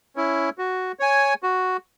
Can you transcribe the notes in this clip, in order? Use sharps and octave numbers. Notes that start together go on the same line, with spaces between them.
C#4 E4
F#4
C#5 G#5
F#4